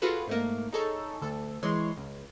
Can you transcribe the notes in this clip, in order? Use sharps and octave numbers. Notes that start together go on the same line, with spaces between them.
F4 F#4 G#4 A4 B4
G#2 A3 A#3
D#4 G#4 A4 C#5
D2 A4
E3 G#3 C#5 C6
C#2